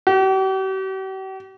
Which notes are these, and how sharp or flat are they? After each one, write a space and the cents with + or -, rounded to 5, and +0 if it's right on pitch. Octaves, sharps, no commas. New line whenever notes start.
G4 -45